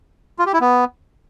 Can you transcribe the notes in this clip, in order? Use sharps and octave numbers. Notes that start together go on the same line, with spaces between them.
F4
G4
E4
B3